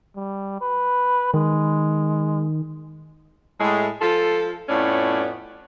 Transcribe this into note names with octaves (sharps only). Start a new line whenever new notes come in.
G3
B4
D#3 G#3
A2 G#3
F3 F4 A4
F2 A2 B3 C#4 D5